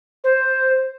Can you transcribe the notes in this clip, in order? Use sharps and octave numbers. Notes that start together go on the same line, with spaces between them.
C5